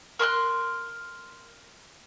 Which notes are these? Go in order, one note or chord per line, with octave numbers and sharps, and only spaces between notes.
A#4 C6 E6 F#6